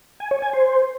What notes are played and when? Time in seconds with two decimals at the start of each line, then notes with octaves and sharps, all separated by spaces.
0.20 G#5
0.31 C#5
0.42 G#5
0.53 C5